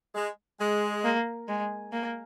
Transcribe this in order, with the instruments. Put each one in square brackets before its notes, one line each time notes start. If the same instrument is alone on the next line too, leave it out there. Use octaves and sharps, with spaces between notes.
[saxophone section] G#3
G#3
[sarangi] A#3
G#3
A#3